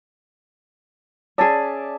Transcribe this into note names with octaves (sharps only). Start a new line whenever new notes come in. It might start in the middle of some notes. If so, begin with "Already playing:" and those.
C#4 G#4 D5 E5 A5